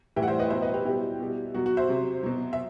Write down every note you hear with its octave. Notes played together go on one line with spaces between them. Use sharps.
A2 E3 G3 E5 G5
F#5
C5 E5
B4 D#5
B2 F#3 C5 E5
B4 D#5
G4 B4
B2 G3 E4 G4
B2 G3
B2 F#3 F#4
F#4
C5 E5
C3 F#3
B2 F#3
E5